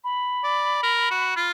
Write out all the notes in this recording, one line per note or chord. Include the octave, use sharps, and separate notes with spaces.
B5
D5
A#4
F#4
F4